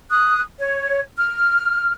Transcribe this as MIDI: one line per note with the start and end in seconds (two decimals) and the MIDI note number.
0.11 0.40 87
0.11 0.40 90
0.59 1.00 73
1.17 1.93 89